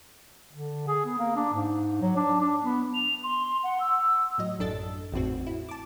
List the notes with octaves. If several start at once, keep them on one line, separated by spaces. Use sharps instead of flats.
D3
G#4
B3
A#3
D4
G#2
F#3
D4
D4
B3
F7
C6
F#5
E6
A2 F#3 D#5
A1 F#2 D4 A4 A6
G#1 E2 A2 C4 F#4
E4
A5 D6